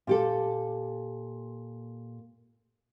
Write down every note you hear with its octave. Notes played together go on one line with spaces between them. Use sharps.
A#2 G4 A4